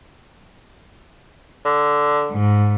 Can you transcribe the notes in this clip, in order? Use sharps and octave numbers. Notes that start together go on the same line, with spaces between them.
D3
G#2